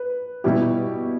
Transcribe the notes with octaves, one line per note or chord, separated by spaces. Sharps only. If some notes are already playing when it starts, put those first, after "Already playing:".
Already playing: B4
B2 G3 E4 G4